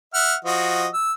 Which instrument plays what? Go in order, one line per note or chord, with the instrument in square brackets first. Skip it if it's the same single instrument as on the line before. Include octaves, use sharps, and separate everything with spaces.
[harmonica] E5 F#5 F6
F3 F#4 D#5
E6